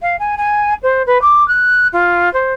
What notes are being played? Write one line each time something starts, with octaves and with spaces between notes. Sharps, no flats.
F5
G#5
G#5
C5
B4
D6
F#6
F4
C5